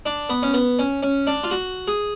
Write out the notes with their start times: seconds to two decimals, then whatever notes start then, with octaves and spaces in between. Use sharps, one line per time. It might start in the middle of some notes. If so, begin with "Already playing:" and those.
0.06 D4
0.29 B3
0.43 C#4
0.54 B3
0.79 C#4
1.03 C#4
1.27 D4
1.44 F4
1.51 F#4
1.88 G#4